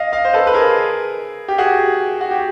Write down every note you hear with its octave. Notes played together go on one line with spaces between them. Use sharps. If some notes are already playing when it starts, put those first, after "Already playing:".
Already playing: D#5 F5
D#5 F5
C5
A4 B4
B4
G#4 A#4
G4
F#4 G#4
F#4
G4